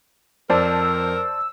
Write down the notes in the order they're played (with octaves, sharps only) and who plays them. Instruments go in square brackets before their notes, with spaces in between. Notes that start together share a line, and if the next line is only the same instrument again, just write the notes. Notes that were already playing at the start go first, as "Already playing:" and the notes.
[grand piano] F2 [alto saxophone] A#4 [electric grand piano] C5 D5 A5 [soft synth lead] E6